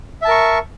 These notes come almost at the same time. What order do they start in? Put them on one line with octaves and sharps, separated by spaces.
E5 A5 A#4 C#6